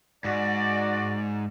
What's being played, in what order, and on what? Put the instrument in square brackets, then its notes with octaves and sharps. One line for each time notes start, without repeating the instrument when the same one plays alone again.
[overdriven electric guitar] G#2 [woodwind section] F#4 D5